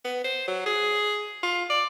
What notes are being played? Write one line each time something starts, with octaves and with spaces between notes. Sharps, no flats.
B3
C5
F#3
G#4
F4
D5